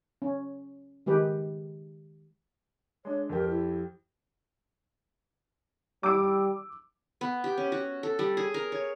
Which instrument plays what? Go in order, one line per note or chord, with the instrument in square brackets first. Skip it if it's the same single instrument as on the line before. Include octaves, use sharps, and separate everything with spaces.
[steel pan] C#4
D#3 G#3 G4 B4
[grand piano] G#3 D4 [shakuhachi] C#5
[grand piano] F2 G4 [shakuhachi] A#4
[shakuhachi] E4
[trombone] G3 [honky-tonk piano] D6 E6 D7
[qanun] B3
G4
C#4
F#4
A4
G3
G#4
A#4
C#5